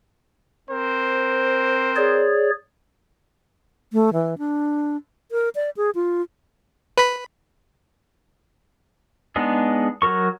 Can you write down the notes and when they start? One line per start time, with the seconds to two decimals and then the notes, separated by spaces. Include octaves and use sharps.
0.69 C4 A#4 C5
1.96 G#4 C#5 D5
3.93 A3
4.13 E3
4.38 D4
5.32 A#4
5.55 D5
5.77 G#4
5.95 F4
6.97 B4 B5
9.36 G#3 B3 D4 D#4 G#4
10.02 F#3 A4 A#4 C#6